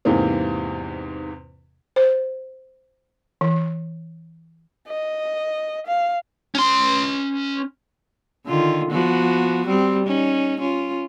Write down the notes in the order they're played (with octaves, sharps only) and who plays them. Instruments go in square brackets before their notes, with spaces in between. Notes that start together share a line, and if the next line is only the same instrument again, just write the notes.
[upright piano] E2 G#2 C3 E3 A#3 C4
[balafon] C5
E3
[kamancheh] D#5
F5
[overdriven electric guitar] C#4 C6
[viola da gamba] D3 D#3 F4
F3 B3 F#4
G3 C4
C#4 D#4
C#4 F4